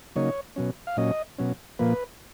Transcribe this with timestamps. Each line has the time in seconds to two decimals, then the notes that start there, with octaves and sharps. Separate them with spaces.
0.16 C#3 F#3 A#3 D#4 C#5
0.56 B2 F#3 C#4
0.87 F5
0.97 A#2 F#3 C#4 D#5
1.38 B2 F#3 C#4
1.79 A#2 F3 A#3 B4